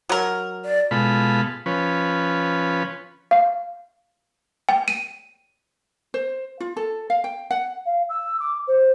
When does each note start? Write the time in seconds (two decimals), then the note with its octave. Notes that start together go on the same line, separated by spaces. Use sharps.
0.09 F#3 A#4
0.65 D5
0.91 B2 G#3 F4 A4 B5
1.66 F3 C#4 B4
3.31 F5
4.69 G5
4.88 D#7
6.14 C5
6.60 F4
6.77 A4
7.10 F5
7.24 G5
7.51 F#5
7.86 F5
8.09 E6
8.40 D6
8.67 C5